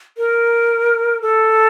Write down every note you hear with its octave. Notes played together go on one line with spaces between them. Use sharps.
A#4
A4